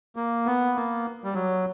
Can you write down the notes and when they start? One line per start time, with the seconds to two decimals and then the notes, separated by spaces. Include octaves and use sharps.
0.16 A#3
0.46 B3
0.75 A#3
1.24 G3
1.34 F#3